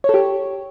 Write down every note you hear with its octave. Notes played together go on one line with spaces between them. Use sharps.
G4 A4 C#5